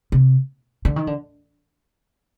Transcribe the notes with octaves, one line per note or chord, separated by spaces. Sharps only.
C3
D3
D#3
D3